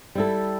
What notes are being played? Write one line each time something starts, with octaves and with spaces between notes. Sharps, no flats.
G3 E4 A4